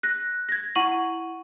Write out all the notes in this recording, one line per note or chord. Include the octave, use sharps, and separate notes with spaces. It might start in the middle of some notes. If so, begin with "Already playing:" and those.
F#6 A#6
G#6 A#6
E4 F#5 C#6 D#7 F#7